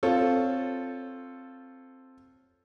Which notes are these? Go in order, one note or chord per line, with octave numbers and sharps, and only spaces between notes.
C4 F4 A4 C#5